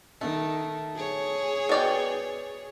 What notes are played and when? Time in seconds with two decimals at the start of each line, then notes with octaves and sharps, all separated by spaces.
0.21 D#3 A3
0.96 G#4 C#5
1.69 B2 D5 G5